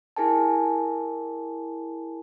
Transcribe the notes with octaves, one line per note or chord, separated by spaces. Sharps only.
E4 G#4 A#4 G#5 A5